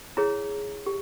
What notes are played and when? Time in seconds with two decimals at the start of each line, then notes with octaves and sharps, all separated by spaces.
0.17 E4 G#4 C#5 A#5
0.86 G4